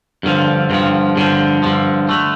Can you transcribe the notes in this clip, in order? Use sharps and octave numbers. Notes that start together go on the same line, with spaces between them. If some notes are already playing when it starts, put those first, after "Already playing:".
G2 D3 F3
G2 D3 F3
G2 D3 F3
G2 D3 F3
D3 A3